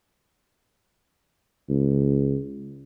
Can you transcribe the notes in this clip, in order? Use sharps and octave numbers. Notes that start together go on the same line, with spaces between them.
C#2